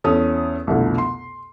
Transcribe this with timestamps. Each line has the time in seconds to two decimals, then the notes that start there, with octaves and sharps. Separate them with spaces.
0.04 E2 C#4 A4 D#6
0.67 C2 F2 B2 D3 A3
0.98 C6